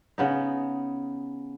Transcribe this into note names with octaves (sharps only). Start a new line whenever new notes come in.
C#3 B3 D#4